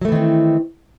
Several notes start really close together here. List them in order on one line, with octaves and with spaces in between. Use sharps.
F#3 A3 E3 D#3 C4